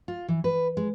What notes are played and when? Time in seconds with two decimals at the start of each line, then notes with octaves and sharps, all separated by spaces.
0.08 F4
0.28 E3
0.44 B4
0.77 G#3